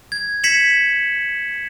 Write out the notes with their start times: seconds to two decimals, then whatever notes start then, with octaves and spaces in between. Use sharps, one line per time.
0.12 G#6
0.44 G#6 B6 C#7 E7 F#7